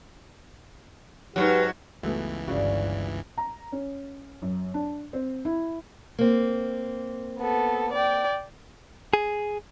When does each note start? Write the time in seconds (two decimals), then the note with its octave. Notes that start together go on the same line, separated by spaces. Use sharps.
1.36 G#2 C3 F#3 F#4 G4 B4
2.03 C#2 F#2 E3 A3 B3
2.47 G1 C#3 D4 F#4 D5
3.38 A#5
3.72 C#4
4.42 F#2
4.74 D4
5.13 C4
5.45 E4
6.19 A#3 C4
7.39 B3 A4
7.93 D5 G5
9.13 G#4